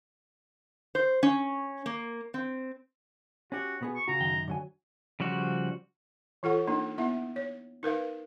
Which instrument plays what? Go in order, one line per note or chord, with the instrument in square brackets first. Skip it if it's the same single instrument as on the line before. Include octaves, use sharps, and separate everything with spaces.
[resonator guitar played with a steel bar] C5
C#4
A#3
C4
[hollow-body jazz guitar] C#4 G4 [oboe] F#4
[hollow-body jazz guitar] B2 B3 G#4
[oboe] C#6
[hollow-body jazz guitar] C#3 F#4 [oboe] A#5
[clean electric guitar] F#2 D#3 G5
[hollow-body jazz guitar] D3 F#3 G#5
[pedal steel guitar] C#3 F3 G3 F#4
[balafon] E3 F4 A4 F#5
A#3 D4 D#4
B3 E4 E5 F#5
C#5
D#4 A#4 B4 F5